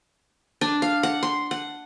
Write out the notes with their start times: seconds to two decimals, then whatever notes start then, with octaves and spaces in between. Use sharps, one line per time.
0.61 D4
0.82 F5
1.03 F#5
1.23 C6
1.51 F#5